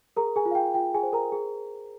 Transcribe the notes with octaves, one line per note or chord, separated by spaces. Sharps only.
G#4 A#4 A#5
G#4 G#5
F4
F5
G5
F4 G5
G#4 G#5
C5
A#4 A#5
G#4